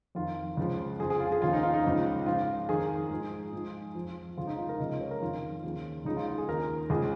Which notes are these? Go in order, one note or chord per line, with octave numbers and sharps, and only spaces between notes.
F2 D#3 F4
C#2 C#3 F3
F2 F3 G#4
G#4
F4
G#4
D#2 C#3 F3 F4
D#4
F4
D#4
C#2 C#3 F3 D#4
G#2 F3 F4
F2 D#3 G#4
G#2 F3
G#2 F3
F2 F3
C#2 C#3 F3 F4
D#4
F4
A#4
C#2 C#3 F3 D#5
D#5
C#5
A#4
F2 D#3 F4
D#2 C#3 F3
C#2 C#3 F3 D#4
F4
F4
G#4
D#2 D#3 A#4
C#2 C#3 F3 G#4